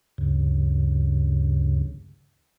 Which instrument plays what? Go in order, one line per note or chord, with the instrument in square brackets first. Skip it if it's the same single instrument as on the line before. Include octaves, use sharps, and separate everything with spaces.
[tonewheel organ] D2 G2 C#3